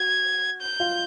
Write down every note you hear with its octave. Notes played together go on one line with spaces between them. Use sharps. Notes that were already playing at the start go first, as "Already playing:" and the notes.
Already playing: F#4 G#6
G6
F4 F5